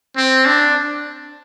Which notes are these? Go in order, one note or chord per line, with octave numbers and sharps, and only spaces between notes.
C4
D4